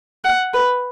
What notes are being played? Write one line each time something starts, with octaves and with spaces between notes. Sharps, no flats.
F#5
B4